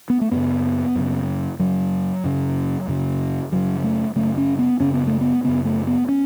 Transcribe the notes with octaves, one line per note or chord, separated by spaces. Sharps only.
B3
A3
F#2 C#3 B3
F#2 C#3
F#2 C#3 F#3
F#2 C#3
F#2 C#3
F#2 C#3 F#3
A3
F#2 C#3 A3
C#4
B3
F#2 C#3 C#4
B3
A3
B3
F#2 C#3 B3
A3
B3
C#4